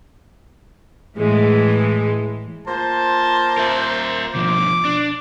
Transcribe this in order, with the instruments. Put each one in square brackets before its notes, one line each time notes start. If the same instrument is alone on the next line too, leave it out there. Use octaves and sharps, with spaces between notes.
[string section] A2 E3 G#3
[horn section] A#3 F4 C5 [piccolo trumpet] A5
[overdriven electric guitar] A#4 E5
[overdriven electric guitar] B2 F3 [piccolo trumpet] D6
[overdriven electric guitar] D4